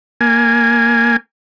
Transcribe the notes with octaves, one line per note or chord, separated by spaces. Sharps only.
A#3 G#5